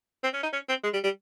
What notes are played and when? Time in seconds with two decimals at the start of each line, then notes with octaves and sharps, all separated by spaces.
0.23 C4
0.33 C#4
0.43 D#4
0.53 C#4
0.69 C4
0.83 G#3
0.93 G3
1.04 G3